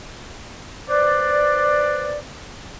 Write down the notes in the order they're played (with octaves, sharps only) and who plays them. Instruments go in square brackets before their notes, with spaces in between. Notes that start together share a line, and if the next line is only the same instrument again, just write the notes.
[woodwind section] B4 C5 D5